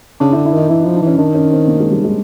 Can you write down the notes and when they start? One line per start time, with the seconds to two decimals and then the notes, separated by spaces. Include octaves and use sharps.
0.20 C#3 D4
0.32 E4
0.36 D3
0.45 E4
0.53 D#3 D#4
0.69 E3 E4
0.82 D#4
0.86 F3
0.94 D4
1.02 E3 C#4
1.18 D#3 D4
1.35 C#4
1.51 C4
1.68 A#3
1.80 G#3
1.91 G3
2.04 G#3